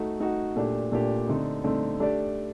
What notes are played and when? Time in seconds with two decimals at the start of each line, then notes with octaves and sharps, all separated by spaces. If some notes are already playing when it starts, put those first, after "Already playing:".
Already playing: A3 D#4 F#4
0.20 A3 D#4 F#4
0.56 A#2 A3 D4 G4
0.92 A#2 A3 D4 G4
1.28 D3 A3 C4 D#4
1.64 D3 A3 C4 D#4
2.00 A3 D4 G4 D5